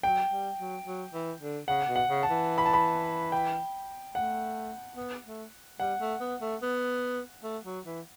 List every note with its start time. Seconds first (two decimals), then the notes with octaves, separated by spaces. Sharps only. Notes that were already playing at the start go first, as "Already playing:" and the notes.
0.03 F#3 G5
0.30 G3
0.58 F#3
0.85 F#3
1.13 E3
1.40 D3
1.68 C#3 F#5
1.88 B2
1.96 F#5
2.10 C#3
2.23 A5
2.30 E3
2.58 B5
2.66 A5
2.73 B5
3.32 G5
4.15 A3 F#5
4.97 B3
5.25 A3
5.80 G3 F#5
6.00 A3
6.21 B3
6.41 A3
6.62 B3
7.43 A3
7.65 F#3
7.86 E3